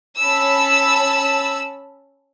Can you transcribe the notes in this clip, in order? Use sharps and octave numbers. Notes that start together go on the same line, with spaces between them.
C#4 A5 B5 E6